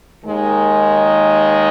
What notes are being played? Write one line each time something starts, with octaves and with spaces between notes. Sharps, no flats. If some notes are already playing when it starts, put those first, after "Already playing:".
D#2 D#3 G#3